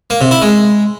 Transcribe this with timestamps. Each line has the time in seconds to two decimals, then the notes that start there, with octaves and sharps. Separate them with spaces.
0.10 A#3
0.21 C3
0.31 E4
0.42 G#3